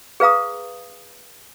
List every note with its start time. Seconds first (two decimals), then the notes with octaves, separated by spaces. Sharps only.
0.20 G#4 B4 F5 A#5 D#6